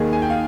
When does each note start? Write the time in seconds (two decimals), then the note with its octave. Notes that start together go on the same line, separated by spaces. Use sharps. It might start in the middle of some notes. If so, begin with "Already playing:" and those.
Already playing: D#2 D#3 G#4
0.13 G#5
0.22 G5
0.30 F5